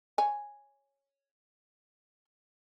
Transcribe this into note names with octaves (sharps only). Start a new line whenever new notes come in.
C#5 G#5